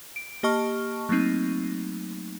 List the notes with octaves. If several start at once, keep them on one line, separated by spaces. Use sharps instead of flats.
D7
A#3 G4 D#5 A5 C#6 F6
F#3 A3 A#3 C4 D#4